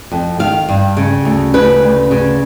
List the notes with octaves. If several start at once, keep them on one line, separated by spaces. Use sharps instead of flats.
F2
D#3 F5
G2
C#3
D2
C#3 B4
D2
C#3